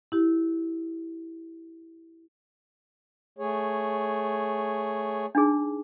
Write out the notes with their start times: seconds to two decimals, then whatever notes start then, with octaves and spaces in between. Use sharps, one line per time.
0.12 E4 G4
3.38 A3 G#4 C#5
5.35 D4 D#4 G#4